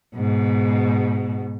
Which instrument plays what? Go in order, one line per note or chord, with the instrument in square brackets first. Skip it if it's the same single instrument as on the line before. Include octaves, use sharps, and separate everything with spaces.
[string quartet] G#2 B2